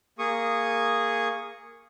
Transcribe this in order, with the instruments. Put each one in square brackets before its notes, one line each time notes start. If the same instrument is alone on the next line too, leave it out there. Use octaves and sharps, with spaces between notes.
[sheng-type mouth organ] A#3 G#4 C#6 D#6